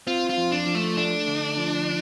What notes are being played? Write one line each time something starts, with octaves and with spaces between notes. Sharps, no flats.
C4 F4
F4
F2
D4
F3
A3
A3 D4
D3
F3